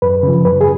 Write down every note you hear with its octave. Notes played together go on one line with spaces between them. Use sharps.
F#2 B4
C#3 F3
F#2 B4
G#4